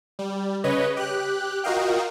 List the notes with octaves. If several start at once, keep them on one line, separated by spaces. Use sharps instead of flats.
G3
C#3 B4 C#5 D#5
G4 F#6
F4 F#4 A#4 D#5 F5 G5